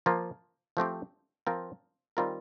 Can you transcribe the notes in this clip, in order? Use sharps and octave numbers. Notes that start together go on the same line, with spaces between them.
F3 A#3 F4
F3 A3 C4 G4
F3 C4 F4 A#4
D#3 G3 C4 F4 A#4